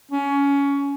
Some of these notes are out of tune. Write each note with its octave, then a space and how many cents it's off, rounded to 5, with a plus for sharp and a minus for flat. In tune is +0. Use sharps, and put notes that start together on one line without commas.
C#4 +20